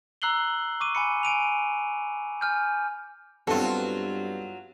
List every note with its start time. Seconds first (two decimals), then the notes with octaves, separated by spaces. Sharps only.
0.22 A#5 E6 F#6 C7 F#7 G7
0.80 C#6 D6 D#7
0.95 G#5 B5 C#7
1.23 G#5 D7 D#7 F7
2.41 G#5 F6 G6
3.47 G2 F#3 B3 C4 F4 A4